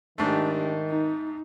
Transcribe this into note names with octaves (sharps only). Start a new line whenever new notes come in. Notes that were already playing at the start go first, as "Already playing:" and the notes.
G#2 D#3 A3 D4 G4
D#4